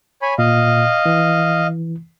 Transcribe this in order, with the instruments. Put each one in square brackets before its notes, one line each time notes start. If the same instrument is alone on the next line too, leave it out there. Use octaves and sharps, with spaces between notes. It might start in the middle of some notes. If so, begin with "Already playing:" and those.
[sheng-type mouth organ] C#5 G#5 B5
[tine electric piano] A#2 [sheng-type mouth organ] D#5 F5
[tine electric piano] E3